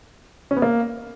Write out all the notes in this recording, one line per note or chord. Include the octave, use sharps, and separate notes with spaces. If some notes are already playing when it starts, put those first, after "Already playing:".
C#4
B3
A#3